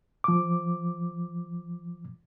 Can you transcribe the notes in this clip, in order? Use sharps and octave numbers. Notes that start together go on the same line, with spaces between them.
F3 D6